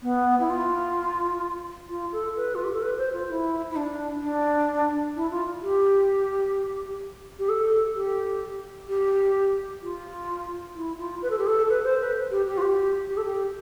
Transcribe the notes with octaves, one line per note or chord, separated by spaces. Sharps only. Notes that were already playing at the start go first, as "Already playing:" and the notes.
B3
E4
F4
F4
A4
B4
F4
G4
A4
B4
C5
F4
E4
E4
D4
D4
E4
F4
G4
G4
A4
G4
G4
F4
E4
F4
B4
A4
G4
A4
B4
C5
B4
G4
G4
F4
G4
G4
A4
G4